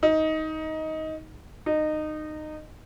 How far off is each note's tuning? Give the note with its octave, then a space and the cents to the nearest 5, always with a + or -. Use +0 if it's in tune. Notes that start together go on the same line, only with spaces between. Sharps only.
D#4 +15
D#4 -20